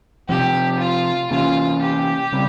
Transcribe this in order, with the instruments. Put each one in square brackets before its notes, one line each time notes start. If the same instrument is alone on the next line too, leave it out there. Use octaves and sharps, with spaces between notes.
[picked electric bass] C3 F3 C4 [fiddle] G4
[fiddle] F4
[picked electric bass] C3 E3 A#3 C#4 [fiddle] F4
[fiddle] G4
[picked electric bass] C#3 G3 C4